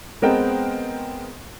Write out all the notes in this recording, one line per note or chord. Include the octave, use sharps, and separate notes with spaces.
G#3 B3 C4 A#4 D#5 G5